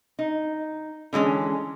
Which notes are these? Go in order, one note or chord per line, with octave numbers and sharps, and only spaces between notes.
D#4
D3 E3 G#3 C#4